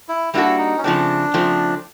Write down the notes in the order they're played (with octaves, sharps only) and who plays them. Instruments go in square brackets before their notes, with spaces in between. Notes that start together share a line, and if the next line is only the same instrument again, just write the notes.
[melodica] E4
[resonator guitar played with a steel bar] G3 A#3 D4 F#4 A4 [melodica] E4
[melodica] D#4
C#4
[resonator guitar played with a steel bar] C#3 F3 A3 C4 [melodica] D4
[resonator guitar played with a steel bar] C#3 F3 A3 C4